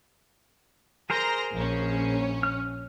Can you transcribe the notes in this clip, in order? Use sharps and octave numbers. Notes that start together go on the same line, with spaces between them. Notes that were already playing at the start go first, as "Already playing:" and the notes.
G#4 A#4 C5 A#5 C6 A#6
A#1 C#4
F6